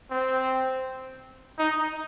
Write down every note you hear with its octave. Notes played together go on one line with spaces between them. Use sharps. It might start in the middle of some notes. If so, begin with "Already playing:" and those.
C4
D#4